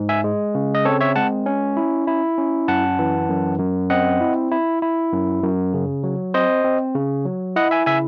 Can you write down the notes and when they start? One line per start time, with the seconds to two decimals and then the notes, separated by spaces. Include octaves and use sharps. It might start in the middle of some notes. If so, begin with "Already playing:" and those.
Already playing: G#2
0.09 E5 G#5
0.24 G#3
0.55 C#3
0.75 D#5
0.85 C4 A4 C#5
1.01 C#5 E5
1.16 G#3 F#5 A5
1.46 C#4
1.77 E4
2.07 E4
2.38 C#4
2.68 F#2 F#5 A5
2.99 E3
3.29 F#2
3.59 F#2
3.90 C4 D#5 F#5
4.20 E4
4.52 E4
4.82 E4
5.12 F#2
5.43 F#2
5.74 C#3
6.03 F#3
6.34 C4 C5 D#5
6.64 C4
6.95 C#3
7.25 F#3
7.56 E4 D#5 F#5
7.71 E5 G#5
7.86 C#3 E5 G#5